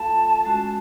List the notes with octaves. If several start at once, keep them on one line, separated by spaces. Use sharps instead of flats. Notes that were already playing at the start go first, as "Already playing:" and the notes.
Already playing: A3 F4 A4 F5 A5
G#3 C#4 F#4